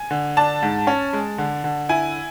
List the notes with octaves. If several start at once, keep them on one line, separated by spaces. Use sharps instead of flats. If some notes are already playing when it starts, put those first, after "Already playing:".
Already playing: G#5
D3
D4 A5
G#2
C#4
G#3
D3
D3
E4 G#5